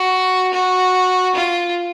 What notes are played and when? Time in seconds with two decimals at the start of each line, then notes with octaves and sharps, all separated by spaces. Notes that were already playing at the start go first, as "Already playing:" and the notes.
Already playing: F#4
0.54 F#4
1.35 F4